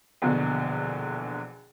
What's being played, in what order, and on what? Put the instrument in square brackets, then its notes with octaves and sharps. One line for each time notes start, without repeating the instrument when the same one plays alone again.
[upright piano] A#1 E2 B2 D3